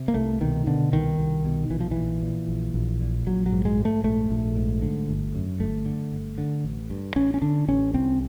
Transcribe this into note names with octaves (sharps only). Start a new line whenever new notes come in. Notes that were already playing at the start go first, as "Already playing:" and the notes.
Already playing: C3
A#3
C2 A3
B2 D#3
B2 D3
C2 D#3
C2
B2
A#1 E3
F3
E3
A#2
A#2
A#1
A#1
A#2
A#1 F#3
F#3
G#2
G#3
G#2
A3
A#1 A3
A#1
G#2
D3
G1
F#2
G1 A3
D3
G1
D3
A1
G2
A1 C#4
C#4
D3 D4
A1 C#4
C2 C4